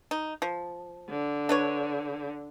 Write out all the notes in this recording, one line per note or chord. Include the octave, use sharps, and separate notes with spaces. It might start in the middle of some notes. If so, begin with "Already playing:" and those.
D#4
F3
D3
D4 B4 C#5